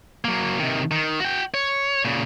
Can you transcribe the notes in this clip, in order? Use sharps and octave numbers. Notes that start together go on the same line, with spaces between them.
F#3 A#3
C3 D#3
D#3
F#4 G5
C#5
A#2 C#3